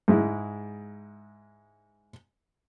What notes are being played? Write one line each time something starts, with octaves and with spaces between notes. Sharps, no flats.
G#2 G#3 E4